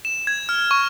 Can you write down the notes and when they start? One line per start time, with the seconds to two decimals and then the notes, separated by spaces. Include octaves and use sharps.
0.05 E7
0.27 G#6
0.49 F6
0.71 C#6